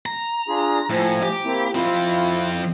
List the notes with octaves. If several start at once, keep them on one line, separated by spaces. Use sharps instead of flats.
A#5
D4 F4 G#4
A2 F3 G#5 A#5
G4
A#3 C4 E4
F2 C4 E4 F4